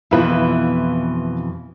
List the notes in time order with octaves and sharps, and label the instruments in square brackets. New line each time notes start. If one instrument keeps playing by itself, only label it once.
[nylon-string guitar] F2 B2 E3 [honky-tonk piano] E4 F4 B4